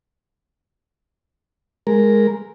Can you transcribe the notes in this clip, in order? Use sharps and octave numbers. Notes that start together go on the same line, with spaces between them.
G#3 A#4